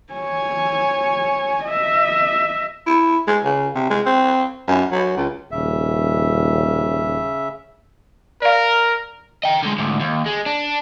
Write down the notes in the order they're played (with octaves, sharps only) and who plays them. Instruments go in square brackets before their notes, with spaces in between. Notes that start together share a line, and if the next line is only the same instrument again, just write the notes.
[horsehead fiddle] C#5 G#5
D#5 E5
[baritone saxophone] E4
G#3
C#3
C3
G#3
C4
F#2
F#3
C#2
[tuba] D#1 [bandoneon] C#3 E5
[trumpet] A#4 [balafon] D5 F5
[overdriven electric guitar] D#5 G5
D3 G#3
D2 G#2
D#2
G#3
D4